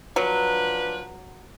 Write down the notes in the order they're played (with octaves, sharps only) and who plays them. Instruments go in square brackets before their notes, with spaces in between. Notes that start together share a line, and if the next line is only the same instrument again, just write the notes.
[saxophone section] F3 D4 B4 [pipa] F#3